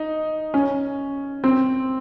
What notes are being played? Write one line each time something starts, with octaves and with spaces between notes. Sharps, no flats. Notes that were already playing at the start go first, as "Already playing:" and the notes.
Already playing: D#4
C#4
C4